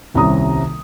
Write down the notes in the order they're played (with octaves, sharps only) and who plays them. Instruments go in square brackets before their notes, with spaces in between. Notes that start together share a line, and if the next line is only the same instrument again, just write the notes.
[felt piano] D#1 C2 C3 C#4 A#5 D#6